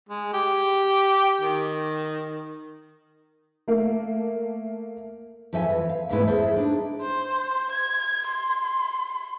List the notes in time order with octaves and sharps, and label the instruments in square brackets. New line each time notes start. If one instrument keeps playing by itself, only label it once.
[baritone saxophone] G#3
G4
D#3
[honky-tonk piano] A3 A#3
[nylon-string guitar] F2 F3 A4 E5 G5 G#5
E3
F5
E2 G#2 G#3 A3 E4 B4
E4 G#4 A4 C5 E5
D4 D#4
[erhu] C5
G#6
C6